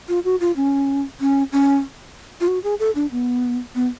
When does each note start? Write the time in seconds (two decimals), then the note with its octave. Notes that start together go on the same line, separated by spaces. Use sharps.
0.08 F4
0.25 F#4
0.40 F4
0.56 C#4
1.21 C#4
1.52 C#4
2.41 F4
2.48 F#4
2.64 G#4
2.80 A4
2.95 D4
3.11 B3
3.75 B3